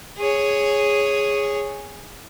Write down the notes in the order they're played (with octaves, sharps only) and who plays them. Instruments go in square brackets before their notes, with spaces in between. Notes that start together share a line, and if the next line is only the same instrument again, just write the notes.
[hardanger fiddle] G#4 C#5